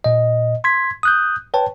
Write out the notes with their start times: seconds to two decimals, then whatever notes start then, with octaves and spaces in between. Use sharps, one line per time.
0.04 A#2 D#5
0.64 C6 G#6 B6
1.03 D#6 F#6 G6
1.54 B4 C#5 G5 A5